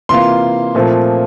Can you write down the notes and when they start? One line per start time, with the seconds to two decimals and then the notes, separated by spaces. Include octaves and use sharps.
0.09 C3 E3 A#3 F4 C6
0.75 A#2 F3 A3 C4 F4